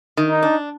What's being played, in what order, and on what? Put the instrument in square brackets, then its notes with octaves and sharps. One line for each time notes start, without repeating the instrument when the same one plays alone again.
[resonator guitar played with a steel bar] D#3
[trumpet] D#4
[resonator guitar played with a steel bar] D4